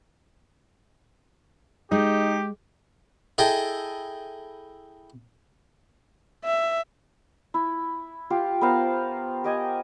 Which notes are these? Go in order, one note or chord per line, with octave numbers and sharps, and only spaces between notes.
G#3 D#4 G4
E4 G#4 A4 D#5 G5
E5
E4
F4 G4 F5
B3 A#4 C5 F5
G4 D#5 G#5